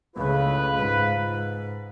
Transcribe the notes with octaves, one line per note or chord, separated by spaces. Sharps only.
C#2 A2 C#3 F4 B4
G#2